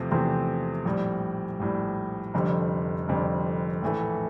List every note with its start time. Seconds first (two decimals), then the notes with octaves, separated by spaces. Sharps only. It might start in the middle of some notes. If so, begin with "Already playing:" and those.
Already playing: E2 C3 F3 A3 C4
0.11 E2 C3 F3 A3 C4
0.85 A#1 A2 G3
1.60 A#1 A2 G3
2.34 F1 F2 D3 G3
3.08 F1 F2 D3 G3
3.82 A#1 A2 E3 A3